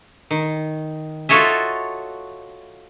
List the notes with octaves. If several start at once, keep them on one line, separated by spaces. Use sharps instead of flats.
D#3
F4 F#4 A4 C#5 D#5 E5